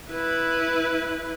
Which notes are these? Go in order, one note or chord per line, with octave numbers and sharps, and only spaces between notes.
E4 B4